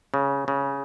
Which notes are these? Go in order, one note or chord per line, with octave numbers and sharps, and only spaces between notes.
C#3
C#3